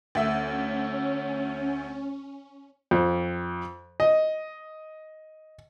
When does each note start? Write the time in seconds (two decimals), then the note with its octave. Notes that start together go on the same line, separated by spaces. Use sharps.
0.15 D2 C#4 E5
2.91 F2
4.00 D#5